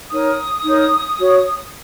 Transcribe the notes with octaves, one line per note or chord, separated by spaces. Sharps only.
D#4 A#4 C#5 D#6
D#4 A#4 C#5
F#4 C#5